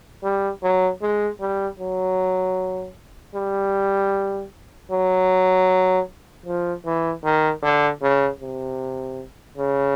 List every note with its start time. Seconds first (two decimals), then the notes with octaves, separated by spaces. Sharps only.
0.23 G3
0.63 F#3
1.01 G#3
1.41 G3
1.79 F#3
3.35 G3
4.91 F#3
6.46 F3
6.85 E3
7.24 D#3
7.62 D3
8.02 C#3
8.40 C3
9.57 C#3